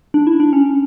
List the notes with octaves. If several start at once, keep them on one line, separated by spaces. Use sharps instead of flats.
D4
E4
D4
C#4